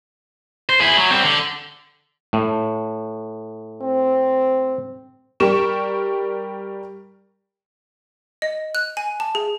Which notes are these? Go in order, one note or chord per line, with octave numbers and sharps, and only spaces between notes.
C5
E4 G#4
F#3
G3 C4
D3
A2
C4
G3 G4 A#4 C#6 E7
D#5
F#6
G#5
A5
G#4